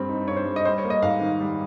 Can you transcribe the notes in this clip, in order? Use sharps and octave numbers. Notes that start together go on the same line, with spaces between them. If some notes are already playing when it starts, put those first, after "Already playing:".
Already playing: G2 G3 C4
D#4
G2 C#5
C5
G3
D#5
G3 C5
C#5
A#3
D#5
G#2 F5
D#3
G3